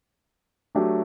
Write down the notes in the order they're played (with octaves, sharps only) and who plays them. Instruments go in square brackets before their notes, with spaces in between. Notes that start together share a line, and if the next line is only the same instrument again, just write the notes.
[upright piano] F#3 A3 D4 G4